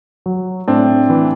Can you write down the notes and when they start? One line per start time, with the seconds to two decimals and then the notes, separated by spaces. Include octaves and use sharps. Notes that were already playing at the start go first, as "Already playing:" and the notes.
0.26 F#3
0.68 A2 C4 D4
1.10 E3